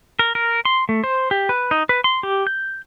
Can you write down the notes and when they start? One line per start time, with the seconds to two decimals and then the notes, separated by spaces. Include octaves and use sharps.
0.19 A#4
0.35 A#4
0.65 C6
0.89 A3
1.04 C5
1.31 G4
1.49 B4
1.71 D#4
1.89 B4
2.04 C6
2.23 G4
2.47 G6